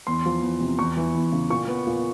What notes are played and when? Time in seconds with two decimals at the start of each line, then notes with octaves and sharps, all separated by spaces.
0.07 E2 C6
0.26 F3
0.42 E2
0.61 C3
0.79 E2 C#6
0.97 E3
1.15 E2
1.32 C#3
1.50 A#2 C#6
1.68 B3
1.87 A#2